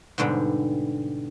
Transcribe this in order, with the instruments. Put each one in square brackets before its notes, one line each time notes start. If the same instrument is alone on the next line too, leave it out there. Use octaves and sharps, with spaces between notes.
[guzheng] G#2 B2 D3 G3